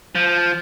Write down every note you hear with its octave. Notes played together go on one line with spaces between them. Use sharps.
F3